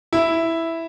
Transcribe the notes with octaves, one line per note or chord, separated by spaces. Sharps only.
E4